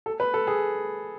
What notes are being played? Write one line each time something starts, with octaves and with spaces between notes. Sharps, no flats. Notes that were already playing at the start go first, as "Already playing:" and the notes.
A4
B4
A4
G#4